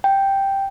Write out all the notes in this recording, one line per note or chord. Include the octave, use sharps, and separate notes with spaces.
G5